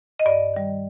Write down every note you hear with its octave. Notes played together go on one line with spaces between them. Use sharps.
D#5
G2 D5
D#3 G3